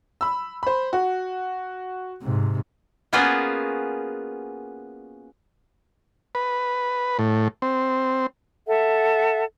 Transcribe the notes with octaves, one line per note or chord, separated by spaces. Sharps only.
B5 E6
C5 B5
F#4
G#2 C3
A#3 B3 C#4 F4 F#4 G#4
B4
A2
C4
A4 E5 F#5